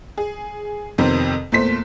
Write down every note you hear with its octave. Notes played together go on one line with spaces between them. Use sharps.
G#4
F2 C3 D#3 B3 C4
E2 A#2 A3 C5 B6